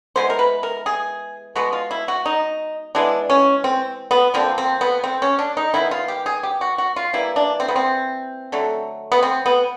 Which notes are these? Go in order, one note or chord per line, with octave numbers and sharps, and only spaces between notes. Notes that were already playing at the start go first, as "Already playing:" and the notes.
E3 G#3 B3 C5
A#4
B4
A#4
G#4
B2 G#3 B3 F#4
F4
E4
F#4
D#4
E3 G#3 B3 D4
C#4
C4
B3
D3 F3 A#3 C4
C4
B3
C4
C#4
D4
D#4
D#3 G#3 B3 E4
F4
G4
G#4
G4
F#4
F#4
F4
E3 G3 A#3 E4
D4
C4
B3
C4
D3 F#3 A3
B3
C4
B3